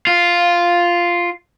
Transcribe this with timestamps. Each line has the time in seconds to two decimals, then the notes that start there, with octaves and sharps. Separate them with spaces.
0.07 F4